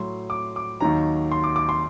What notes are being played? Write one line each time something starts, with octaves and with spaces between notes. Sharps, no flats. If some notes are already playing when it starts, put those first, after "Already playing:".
Already playing: A2 F#3 C6
D6
D6
D#2 D#3 F#3 A#5
C6
D6
D6
C6